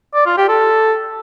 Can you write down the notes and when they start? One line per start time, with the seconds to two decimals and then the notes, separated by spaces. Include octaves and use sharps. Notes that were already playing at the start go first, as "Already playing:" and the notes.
0.14 D5
0.26 F4
0.37 G4
0.49 A4